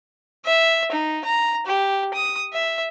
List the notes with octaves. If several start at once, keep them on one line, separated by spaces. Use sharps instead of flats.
E5
D#4
A#5
G4
D#6
E5